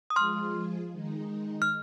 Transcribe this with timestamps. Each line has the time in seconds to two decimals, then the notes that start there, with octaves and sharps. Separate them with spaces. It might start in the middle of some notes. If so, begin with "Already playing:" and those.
0.10 D#6
0.16 F3 G#3 F4 G#4 C6 F6
0.93 D#3 G#3 D#4
1.62 F6